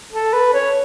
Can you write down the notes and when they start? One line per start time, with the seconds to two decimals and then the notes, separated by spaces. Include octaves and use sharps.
0.12 A4
0.33 B4
0.53 C#5